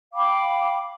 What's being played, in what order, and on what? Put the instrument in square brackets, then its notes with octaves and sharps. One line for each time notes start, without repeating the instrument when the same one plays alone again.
[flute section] F5 G5 B5 D6